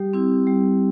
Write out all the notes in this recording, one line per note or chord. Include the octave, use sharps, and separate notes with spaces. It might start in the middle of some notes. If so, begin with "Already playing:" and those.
Already playing: G3 G4
C4 E4
G3